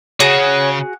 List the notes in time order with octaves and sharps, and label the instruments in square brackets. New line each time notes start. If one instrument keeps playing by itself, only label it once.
[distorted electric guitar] C#3 [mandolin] F#4 G#4 [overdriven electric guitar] C#5